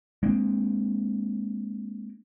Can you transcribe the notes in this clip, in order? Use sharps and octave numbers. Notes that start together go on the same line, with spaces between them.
G#3 A#3 C4 D4